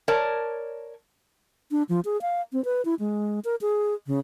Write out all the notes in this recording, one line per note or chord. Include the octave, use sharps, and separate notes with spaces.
A#4 C#5 D5 A5
D4
F3
G#4
F5
C4
B4
E4
G#3
A#4
G#4
C#3